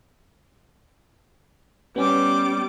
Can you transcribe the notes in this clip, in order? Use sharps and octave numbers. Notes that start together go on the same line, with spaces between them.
G3 B3 C#4 D6